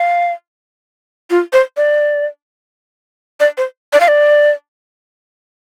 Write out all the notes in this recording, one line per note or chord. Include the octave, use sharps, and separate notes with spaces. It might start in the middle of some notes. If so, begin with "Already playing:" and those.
Already playing: F5
F4
C5
D5
D5
C5
D5
F5
D5